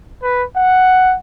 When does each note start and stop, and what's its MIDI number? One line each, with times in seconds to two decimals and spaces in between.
0.23 0.43 71
0.56 1.15 78